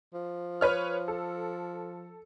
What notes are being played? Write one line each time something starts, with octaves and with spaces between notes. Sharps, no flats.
F3
B4 C#5 F6
A4